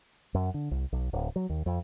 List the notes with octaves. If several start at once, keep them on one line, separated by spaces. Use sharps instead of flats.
F#2
D3
C2
B1
D1
F#3
D#2
F2